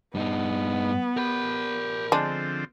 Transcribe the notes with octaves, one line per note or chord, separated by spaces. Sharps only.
G2 B3 D#4
G4 A#4 B5
D3 F3 G#3 C4 D4